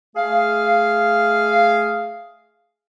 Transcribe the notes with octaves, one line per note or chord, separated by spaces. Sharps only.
A3 G#4 F5